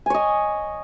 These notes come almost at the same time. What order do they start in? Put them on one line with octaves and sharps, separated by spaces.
G#5 C#5 D#5